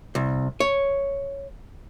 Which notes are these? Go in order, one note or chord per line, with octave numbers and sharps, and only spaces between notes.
C2
C#5